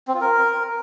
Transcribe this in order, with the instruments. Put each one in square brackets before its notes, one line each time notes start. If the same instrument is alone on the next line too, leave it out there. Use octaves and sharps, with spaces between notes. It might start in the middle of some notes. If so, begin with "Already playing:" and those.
[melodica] C4
F4
A#4